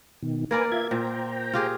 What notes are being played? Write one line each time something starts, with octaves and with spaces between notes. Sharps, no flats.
B2 D#3
A#3 A#4 B4 D5 G#5
F4 E5 G#6
A#2 C5 G5 A#5
F4 G4 G#4